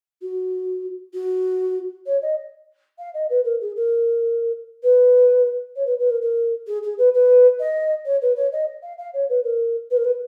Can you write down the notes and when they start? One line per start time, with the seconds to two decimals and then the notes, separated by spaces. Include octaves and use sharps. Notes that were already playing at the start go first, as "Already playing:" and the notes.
0.21 F#4
1.13 F#4
2.06 C#5
2.22 D#5
2.98 F5
3.13 D#5
3.29 B4
3.44 A#4
3.60 G#4
3.76 A#4
4.83 B4
5.75 C#5
5.86 B4
5.98 B4
6.10 A#4
6.21 A#4
6.66 G#4
6.83 G#4
6.98 B4
7.14 B4
7.59 D#5
8.05 C#5
8.21 B4
8.36 C#5
8.52 D#5
8.82 F5
8.97 F5
9.13 C#5
9.29 B4
9.43 A#4
9.90 B4
9.96 A#4
10.04 B4